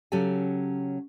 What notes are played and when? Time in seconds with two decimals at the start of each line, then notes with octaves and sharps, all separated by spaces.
0.12 C#3 F#3 C#4 G4 A4 G#5